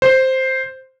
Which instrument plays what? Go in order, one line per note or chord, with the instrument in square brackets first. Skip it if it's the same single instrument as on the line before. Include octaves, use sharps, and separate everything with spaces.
[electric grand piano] C5